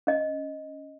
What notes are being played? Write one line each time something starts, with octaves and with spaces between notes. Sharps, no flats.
C#4 D#5